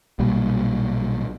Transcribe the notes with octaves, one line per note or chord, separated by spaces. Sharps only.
B1 A#2 G3